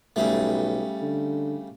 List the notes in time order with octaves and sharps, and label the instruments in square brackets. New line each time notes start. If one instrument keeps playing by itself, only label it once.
[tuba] B1 [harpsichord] C#3 G3 A3
[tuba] D3